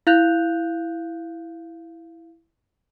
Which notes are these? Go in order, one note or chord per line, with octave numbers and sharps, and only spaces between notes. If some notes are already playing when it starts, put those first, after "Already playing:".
E4 F5 F#6 G6 F7